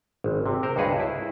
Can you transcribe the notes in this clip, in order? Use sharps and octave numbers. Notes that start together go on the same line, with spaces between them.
G#1
C3
A#4 C5
C#2 G2 F#4 G#4 B4 F#5
E4